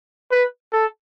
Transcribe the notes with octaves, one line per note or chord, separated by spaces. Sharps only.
B4
A4